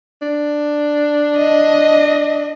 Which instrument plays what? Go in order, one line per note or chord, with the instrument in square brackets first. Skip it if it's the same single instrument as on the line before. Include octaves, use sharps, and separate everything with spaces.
[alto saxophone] D4
[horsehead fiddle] D#5